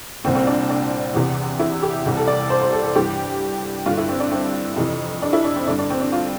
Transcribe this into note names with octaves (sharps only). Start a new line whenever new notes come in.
C2 A#2 C4
C4
D4
D4
E2 C3 E3
E4
G4
C2 C3 E3
A4
D5
C5
C5
A4
A4
G2 E3 G4
G2 D3 F4
E4
C4
D4
C4
F2 C3 E3
D4
E4
D4
C4
G2 D3 D4
D4
C4
D4
F4